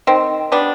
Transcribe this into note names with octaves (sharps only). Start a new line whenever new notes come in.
D#3 C4
G3 B3 D4